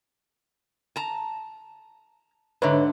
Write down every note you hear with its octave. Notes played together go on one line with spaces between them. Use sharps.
A5 A#5
G#2 D3 B4 C#5 E5